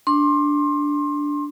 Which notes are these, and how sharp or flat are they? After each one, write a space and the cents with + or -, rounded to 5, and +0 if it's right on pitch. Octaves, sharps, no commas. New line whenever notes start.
D4 -5 C6 +25